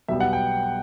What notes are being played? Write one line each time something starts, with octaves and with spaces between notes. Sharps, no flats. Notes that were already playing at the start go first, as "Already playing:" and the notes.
B1 B2 G3 B3 E5
F#5
G5